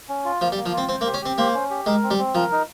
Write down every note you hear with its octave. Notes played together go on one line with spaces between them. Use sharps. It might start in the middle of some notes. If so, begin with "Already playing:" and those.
C#4
F4
F3 A#3
G3
A#3
F3
C4 F4
C4 C5
A#3
G4
C#4
C4 G4
A#3 C5
C#4
G4
G#3 A#4
C4
G3
C4
F3 A#4
D#4